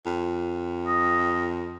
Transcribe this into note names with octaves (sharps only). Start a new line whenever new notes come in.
F2
D#5